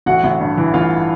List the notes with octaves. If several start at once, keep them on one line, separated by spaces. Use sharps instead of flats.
A1 F#4 F#5
A1
G2
E3
A1 F4 F5